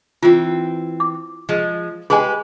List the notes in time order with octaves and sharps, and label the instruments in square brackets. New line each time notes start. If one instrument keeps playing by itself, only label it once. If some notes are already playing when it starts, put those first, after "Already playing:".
[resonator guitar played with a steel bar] E3 C4 [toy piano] F4
[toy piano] D6
[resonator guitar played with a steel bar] F3 G#3
[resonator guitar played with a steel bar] G#3 G4 B4 [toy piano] G#4 G#5